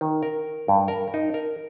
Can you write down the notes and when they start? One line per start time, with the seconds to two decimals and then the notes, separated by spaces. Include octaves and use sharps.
0.01 D#3
0.23 A#4
0.68 G2
0.88 A#4
1.14 D#4
1.34 A#4